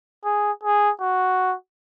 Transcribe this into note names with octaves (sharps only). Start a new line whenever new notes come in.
G#4
G#4
F#4